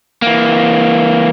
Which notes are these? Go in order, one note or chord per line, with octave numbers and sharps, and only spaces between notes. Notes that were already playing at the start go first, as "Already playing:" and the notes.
E3 A#3